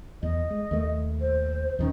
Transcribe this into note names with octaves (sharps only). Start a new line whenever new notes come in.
E2 D#5
G#3
D#2 A3
C5
D#2 D#3 C#4 D#4